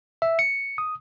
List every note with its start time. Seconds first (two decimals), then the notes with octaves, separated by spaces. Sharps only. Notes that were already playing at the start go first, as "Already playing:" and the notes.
0.22 E5
0.39 C#7
0.78 D#6